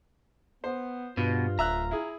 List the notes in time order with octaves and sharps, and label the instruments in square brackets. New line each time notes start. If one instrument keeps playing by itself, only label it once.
[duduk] B3 [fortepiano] C5
[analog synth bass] G2 [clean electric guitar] B2 [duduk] F4
[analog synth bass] D1 [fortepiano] E5 E6 F#6 [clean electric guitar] A#5
[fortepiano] E4 G#4